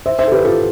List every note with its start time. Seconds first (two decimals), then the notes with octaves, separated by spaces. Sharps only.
0.06 C5 E5
0.19 C5 E5
0.27 A4
0.32 G4 B4
0.45 F4 A4